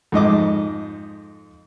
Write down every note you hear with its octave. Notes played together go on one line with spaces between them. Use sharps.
F2 G#2 D#5 D6